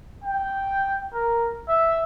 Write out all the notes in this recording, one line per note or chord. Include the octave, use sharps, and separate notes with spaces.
G5
A#4
E5